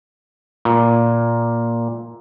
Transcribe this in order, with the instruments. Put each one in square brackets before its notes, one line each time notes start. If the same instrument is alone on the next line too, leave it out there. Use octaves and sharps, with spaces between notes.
[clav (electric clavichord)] A#2